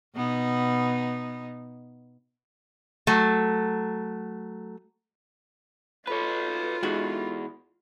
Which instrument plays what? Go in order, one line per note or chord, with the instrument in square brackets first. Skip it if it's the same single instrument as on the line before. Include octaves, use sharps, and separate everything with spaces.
[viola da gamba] B2 B3 D#4
[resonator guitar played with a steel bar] F#3 A3
[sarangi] F4 [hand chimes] A4 B5 [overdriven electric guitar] B4 C#5
[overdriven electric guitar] E2 [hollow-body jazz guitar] G#3 D#4 F#4